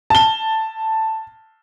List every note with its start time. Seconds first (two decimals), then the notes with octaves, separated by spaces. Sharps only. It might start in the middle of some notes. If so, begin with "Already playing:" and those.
0.10 A5 G7